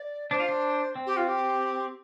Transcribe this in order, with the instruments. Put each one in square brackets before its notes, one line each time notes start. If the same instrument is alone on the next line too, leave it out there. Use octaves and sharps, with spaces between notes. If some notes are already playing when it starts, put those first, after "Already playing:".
Already playing: [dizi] D5
[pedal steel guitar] D4 [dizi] C5
[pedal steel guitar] F4
D4
C4
[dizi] G4
F4
G4